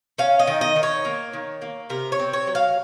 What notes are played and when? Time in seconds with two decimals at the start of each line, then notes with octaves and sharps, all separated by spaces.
0.18 C#4 F5
0.39 D#5
0.47 D#3
0.61 D#5
0.76 D#3
0.83 C#5
1.05 A#3
1.33 D#3
1.62 A#3
1.90 C3 A#4
2.12 C#5
2.19 C4
2.33 C#5
2.47 F#3
2.55 F5